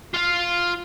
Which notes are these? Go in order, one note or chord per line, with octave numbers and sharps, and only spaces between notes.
F4 F5